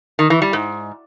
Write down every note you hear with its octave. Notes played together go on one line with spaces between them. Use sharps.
D#3
E3
G3
G#2